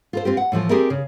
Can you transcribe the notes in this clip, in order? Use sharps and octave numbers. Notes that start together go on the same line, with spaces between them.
F4 A4 C5
C4 F4 G4
F#5
A2 E3 F3 A3
C4 G4 G#4 A#4 D5 E5
C#3